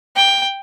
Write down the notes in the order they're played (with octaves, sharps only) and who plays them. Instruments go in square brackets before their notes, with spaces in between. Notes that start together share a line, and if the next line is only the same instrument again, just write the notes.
[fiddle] G5